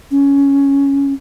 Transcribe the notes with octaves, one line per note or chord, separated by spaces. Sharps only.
C#4